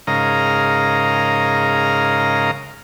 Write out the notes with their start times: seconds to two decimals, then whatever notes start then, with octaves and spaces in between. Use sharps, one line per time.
0.07 G#2 C#3 A#4 D#5 F5 A#5